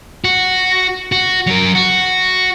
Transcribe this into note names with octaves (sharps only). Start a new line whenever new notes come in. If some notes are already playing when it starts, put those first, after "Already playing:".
F#4
F#4
F#3 A#4
F#4